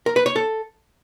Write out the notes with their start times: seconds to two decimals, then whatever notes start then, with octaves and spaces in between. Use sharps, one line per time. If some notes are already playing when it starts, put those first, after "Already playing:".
0.06 A#4
0.16 B4
0.26 C#5
0.36 A4